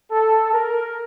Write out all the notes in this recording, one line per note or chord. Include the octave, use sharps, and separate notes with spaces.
A4
A#4